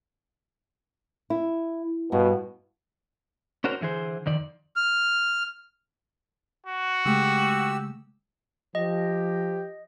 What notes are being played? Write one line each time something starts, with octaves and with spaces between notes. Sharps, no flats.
E4
G2 B2
C#4 D4 F#4 A#4 C5 C#5
D3 E3 G#4 C5
F2 D#3 D5
F6
F#4
C#3 G#3 A3 G4 E6
F3 G4 D#5